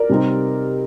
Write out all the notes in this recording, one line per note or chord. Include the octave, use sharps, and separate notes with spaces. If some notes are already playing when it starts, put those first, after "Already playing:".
Already playing: A#4 D5
C3 G3 C4 D#4